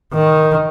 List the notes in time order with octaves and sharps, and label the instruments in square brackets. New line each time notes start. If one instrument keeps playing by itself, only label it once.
[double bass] D#3